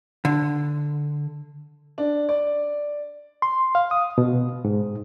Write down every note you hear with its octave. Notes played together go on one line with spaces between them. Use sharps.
D3
D4
D5
C6
F5
D#6
B2
G#2